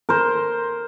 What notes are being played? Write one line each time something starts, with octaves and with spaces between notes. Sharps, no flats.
A#4 C5